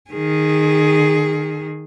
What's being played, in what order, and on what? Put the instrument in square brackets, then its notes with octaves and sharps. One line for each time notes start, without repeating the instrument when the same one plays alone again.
[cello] D#3 G#4